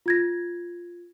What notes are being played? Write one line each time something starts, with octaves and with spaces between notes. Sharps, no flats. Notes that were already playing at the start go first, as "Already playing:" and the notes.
F4 G#6 A#6